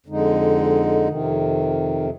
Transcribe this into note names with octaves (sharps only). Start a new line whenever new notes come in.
F2 D3 G#3 D#4
F2 C3 D#3